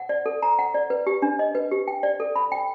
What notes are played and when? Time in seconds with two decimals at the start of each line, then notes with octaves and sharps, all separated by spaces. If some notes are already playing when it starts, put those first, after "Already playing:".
Already playing: F#5
0.09 D5
0.26 A4
0.42 A#5
0.59 F#5
0.74 D5
0.90 B4
1.07 G4
1.22 D4
1.39 D#5
1.55 B4
1.71 G4
1.88 G5
2.03 D5
2.20 A4
2.36 B5
2.52 G5